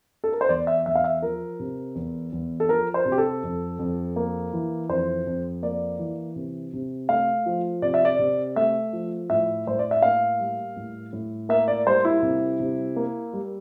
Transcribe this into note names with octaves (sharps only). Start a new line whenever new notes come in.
A4
A#4
C5
E2 D5
E5
E2 E5
F5
E5
F3 A#4
C3
E2
E2
A4
F3 A#4
C5
C3
G4
A4
F2
F2
A#3
E3
F2 C5
F2
A#3 D5
E3
C3
C3
A3 F5
F3
C3 D5
E5
D5
C3
A3 E5
F3
A2 E5
A2 C5
D5
E5
A#3 F5
G3
A2
A2
A#3 E5
D5
G3 C5
E4
C3
C3
A#3
G3